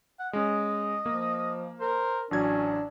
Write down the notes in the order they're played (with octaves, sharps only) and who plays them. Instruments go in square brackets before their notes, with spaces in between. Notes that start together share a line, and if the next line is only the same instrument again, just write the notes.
[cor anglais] F#5
[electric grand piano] G#3 C#4 [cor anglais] D#5
[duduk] F3 [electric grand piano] A#3
[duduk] A#4 [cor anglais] C5
[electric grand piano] A1 F#3 G#6 [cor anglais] C#4 [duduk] D4